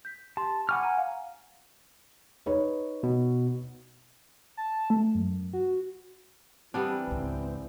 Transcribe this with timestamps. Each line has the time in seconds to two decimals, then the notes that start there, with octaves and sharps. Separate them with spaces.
0.05 G6 B6
0.37 G4 A5 C6
0.69 F#5 G#5 B5 C#6 D6 F6
0.83 A#5 D#7
0.97 F5
2.46 D#4 B4 C#5
3.03 B2
4.57 A5
4.90 A3
5.15 F#2
5.53 F#4
6.74 E3 G3 B3 C4 D4
7.08 C#2 G#2